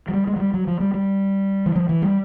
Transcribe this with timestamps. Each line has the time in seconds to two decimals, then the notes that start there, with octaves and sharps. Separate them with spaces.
0.08 F#3
0.14 G3
0.27 G#3
0.36 F#3
0.40 G3
0.54 F#3
0.67 F3
0.80 G3
0.94 G3
1.66 E3
1.76 F3
1.89 E3
2.02 G3